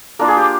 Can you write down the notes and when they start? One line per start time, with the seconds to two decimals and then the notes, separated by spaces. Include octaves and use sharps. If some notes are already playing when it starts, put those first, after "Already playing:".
0.19 A#3 D4 F4 A#4
0.28 G#4
0.37 G4